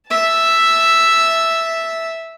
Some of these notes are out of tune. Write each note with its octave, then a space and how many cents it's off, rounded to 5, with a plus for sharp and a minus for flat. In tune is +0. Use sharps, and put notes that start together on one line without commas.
E5 +0 A5 +0